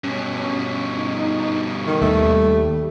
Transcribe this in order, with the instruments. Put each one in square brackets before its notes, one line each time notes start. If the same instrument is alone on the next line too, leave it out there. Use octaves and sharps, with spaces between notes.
[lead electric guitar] G2 B2 [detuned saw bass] C#4
[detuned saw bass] D#4
[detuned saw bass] D3 [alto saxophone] D#3
[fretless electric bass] D#2 [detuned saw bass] G3 [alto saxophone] A3